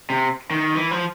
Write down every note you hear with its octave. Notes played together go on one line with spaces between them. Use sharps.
C3
D#3
E3
F3